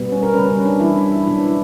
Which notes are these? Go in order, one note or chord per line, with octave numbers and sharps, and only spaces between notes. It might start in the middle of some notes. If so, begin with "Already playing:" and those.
Already playing: B2 G3 B3
C#4
A#4
C#3 G3 C#4 B4
C#4
D4
E3 G3 C#4 E4
D4
E4
B2 F#3 B3 D4
E4